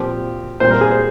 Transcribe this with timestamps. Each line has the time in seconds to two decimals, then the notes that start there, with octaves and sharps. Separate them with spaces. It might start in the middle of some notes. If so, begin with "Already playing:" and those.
Already playing: A#2 F3 C4 G4
0.60 A#2 G3 C4 C5
0.71 A#4
0.81 G#4
0.91 C5